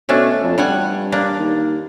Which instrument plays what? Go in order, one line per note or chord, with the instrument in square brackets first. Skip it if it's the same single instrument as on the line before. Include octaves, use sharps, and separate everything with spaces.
[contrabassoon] B2 [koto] A3 C#4 D4
[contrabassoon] F2
[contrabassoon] G2 [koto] G3 F#5 G#5
[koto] A#3 D4
[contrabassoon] D#2